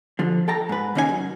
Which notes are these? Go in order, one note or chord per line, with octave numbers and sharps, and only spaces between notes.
D3 F3 F4
A4 G5 A5 A#5
G#2 B4
D#2 C#3 C#4 D#4 G4 G#5
F#2